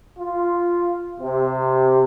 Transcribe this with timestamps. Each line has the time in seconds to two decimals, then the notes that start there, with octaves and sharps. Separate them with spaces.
0.19 F4
1.20 C3